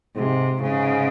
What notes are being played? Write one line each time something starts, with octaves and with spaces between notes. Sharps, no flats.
G#2 C3
G#2 C#3